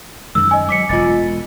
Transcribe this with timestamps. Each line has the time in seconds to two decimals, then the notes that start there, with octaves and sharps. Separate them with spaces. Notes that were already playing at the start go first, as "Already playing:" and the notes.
0.35 F#2 D#3 G#3 E6
0.51 D#5 G#5
0.69 F#3 D6 B6 C#7
0.89 E1 G#3 F4 D#5 A6